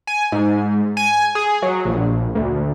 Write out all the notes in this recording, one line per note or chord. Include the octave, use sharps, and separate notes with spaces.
G#5
G#2
G#5
G#4
F#3
A#1
D2